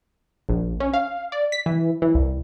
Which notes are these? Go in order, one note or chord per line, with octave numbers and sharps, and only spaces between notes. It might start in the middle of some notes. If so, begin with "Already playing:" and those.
A#1
C#4
F5
D5
B6
E3
E3
C2